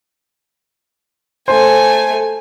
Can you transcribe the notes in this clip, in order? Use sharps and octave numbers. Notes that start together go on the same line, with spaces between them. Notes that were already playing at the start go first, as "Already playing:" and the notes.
A3 C5 G#5